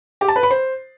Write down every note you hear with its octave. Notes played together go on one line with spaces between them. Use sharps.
G4
A5
B4
B5
C5